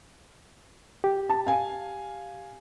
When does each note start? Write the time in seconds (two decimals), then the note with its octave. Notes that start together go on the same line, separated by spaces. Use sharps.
1.04 G4
1.29 A5
1.47 F5 G#5